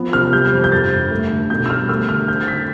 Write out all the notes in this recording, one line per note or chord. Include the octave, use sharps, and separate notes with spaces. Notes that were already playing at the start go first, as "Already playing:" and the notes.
Already playing: F3 B3
C3 F6
G3 G6
F2
G6
G2 A6
G2
A3
D3
B2 G6
E6
G3 F6
A3 E6
D3 F6
C4 G6
A6
D3 B6